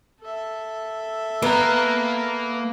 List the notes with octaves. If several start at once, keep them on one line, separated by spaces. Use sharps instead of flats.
A4 E5
A#3 B3 A#5